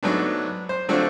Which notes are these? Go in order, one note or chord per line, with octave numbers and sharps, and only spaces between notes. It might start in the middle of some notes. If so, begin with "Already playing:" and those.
G#2 F#3 A3 B3 D4
C5
D3 F#3 A3 C4 D4 F4